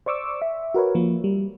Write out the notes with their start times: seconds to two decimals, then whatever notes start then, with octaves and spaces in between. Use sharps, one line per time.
0.06 C5 D5 C#6 D6 E6
0.42 E5
0.74 F#4 A#4 B4 C#5
0.95 F3 A#3
1.24 G3